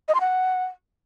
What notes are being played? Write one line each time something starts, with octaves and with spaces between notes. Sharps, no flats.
D#5
C6
F#5